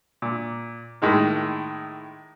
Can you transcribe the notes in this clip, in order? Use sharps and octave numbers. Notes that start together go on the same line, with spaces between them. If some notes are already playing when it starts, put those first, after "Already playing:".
A#2
A2 D#3 G#3 A#3